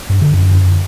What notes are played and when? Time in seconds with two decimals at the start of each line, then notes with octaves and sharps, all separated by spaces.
0.10 G2
0.22 D3
0.34 F#2